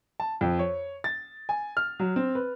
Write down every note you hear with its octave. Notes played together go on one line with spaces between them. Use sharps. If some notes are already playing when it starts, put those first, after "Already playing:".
A5
F2
C#5
A6
G#5
F6
F#3
C4
B4